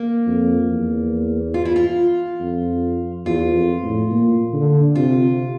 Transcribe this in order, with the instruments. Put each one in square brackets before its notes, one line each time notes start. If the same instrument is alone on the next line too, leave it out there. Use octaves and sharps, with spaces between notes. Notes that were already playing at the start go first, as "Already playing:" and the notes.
Already playing: [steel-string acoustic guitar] A#3
[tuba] F2
E2
[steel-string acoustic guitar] F4
E4
F4
[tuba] F2
[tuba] E2 [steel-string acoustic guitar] F4
[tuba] F2
A2
A#2
D3
[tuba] C3 [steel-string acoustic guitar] F4